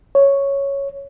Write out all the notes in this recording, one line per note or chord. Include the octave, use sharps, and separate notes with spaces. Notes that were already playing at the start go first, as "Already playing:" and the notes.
C#5